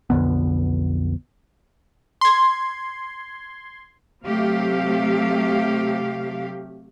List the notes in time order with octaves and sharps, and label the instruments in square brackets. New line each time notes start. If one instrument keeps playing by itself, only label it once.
[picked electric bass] B1 F2 D3 B3
[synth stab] C6 G#6
[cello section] C3 F#3 A3 G4 F5